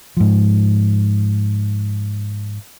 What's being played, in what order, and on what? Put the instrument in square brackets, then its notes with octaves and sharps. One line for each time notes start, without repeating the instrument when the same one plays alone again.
[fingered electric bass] G#2 F3